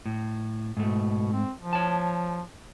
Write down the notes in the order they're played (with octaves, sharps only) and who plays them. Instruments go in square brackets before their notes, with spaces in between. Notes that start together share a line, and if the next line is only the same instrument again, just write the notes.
[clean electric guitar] A2
[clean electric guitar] G#2 A3 [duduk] B2
[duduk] C4
F3
[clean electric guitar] C#5 A5